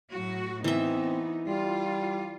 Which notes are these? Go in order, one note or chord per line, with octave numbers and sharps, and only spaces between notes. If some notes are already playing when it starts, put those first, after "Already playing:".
A2 F#3 F#4
E3 B3 C4 D#4 E5
G3 F4